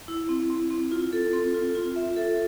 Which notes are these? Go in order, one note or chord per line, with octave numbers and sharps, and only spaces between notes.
E4
C4
C4
C4
F4
A4
C4
F4
F4
E5
A4